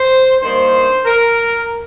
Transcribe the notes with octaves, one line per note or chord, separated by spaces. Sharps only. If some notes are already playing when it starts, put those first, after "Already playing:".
Already playing: C5
G2 D#3 A#3 C5
A#4